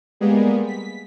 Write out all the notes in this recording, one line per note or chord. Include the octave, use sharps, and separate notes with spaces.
G3 G#3 A#3 B3 G#4
B6